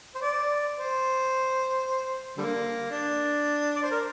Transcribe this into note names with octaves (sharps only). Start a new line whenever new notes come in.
C5
D5
C5
D3 G3 A#3
D4
D5
C5
A#4